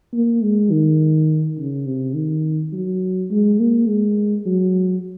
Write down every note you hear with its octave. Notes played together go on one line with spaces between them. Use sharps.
A#3
G#3
D#3
C#3
C3
D#3
F#3
G#3
A#3
G#3
F#3